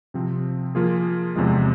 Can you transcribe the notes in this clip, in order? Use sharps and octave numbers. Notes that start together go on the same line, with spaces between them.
C3 F3 C4
F3 A#3 F4 G#4
E2 C3 F3 G#3